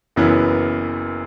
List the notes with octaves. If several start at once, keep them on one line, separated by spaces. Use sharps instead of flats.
F#1 F#2 E3 B3 E4